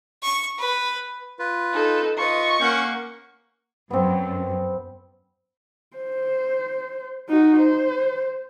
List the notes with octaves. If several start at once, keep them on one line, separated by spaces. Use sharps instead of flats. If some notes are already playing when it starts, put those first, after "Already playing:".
C#6
B4
F4 B4
D#4 A4
F4 B4 D#5 C#6
A#3 C#4 F#5 G6
F#2 B3 C4
C5
D#4 F#4
C5